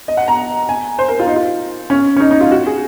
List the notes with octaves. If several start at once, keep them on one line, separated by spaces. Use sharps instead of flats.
D#5
F#5
A#5
G#5
C5
A#4
F4
D#4
F4
C#4
C#4
D#4
D#4
F4
F#4
G#4